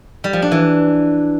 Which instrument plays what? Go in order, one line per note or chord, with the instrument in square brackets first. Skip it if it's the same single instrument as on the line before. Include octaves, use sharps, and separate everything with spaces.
[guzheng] G3
F3
D4
E3